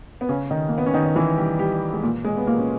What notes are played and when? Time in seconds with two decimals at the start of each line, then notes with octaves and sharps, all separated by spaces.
0.21 B3
0.29 C#3 C#4
0.51 D#3 D#4
0.68 A#3
0.78 B3
0.86 C#4
0.94 D#3 D#4
1.05 D#4
1.16 E3 E4
1.38 G3 G4
1.59 G3 G4
1.93 G#3
2.03 A#2 A#3
2.24 G#3
2.37 B3
2.47 A#2 A#3
2.59 C#4